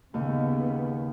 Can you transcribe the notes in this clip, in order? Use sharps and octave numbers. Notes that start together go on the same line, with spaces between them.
D#2 C#3 B3